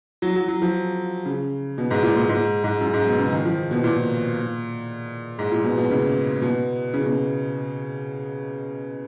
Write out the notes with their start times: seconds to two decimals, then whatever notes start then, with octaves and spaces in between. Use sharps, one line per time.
0.22 F#3
0.36 F#3
0.48 F#3
0.62 F3
1.26 C#3
1.78 B2
1.91 G#2
2.03 A#2
2.16 A#2
2.29 G#2
2.64 G#2
2.81 F#2
2.94 G#2
3.07 B2
3.19 C#3
3.32 D#3
3.45 F3
3.71 B2
3.84 A#2
5.39 G#2
5.52 A#2
5.64 B2
5.78 B2
5.90 C#3
6.42 B2
6.94 C#3
7.06 B2